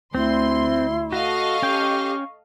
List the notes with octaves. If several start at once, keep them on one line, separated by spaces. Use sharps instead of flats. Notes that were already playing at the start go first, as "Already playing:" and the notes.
D2 C4 E4 C6
F#4 A4 D#5 F5 C#6
C#4 G4 G5